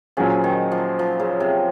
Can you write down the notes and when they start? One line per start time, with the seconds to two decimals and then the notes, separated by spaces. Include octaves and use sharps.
0.17 A#2 F3 F#3 C#4 G#4
0.44 D#3
0.72 F3
0.99 F3
1.20 C#3
1.40 C3